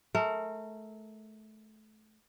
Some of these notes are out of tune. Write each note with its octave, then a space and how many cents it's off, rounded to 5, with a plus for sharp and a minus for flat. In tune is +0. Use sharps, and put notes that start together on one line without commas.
A3 -25 A#4 -30